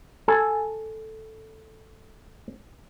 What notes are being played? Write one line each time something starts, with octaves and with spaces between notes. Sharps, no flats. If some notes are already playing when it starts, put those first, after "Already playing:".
A4 G#5